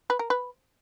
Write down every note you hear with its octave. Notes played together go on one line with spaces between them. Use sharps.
B4
A#4
B4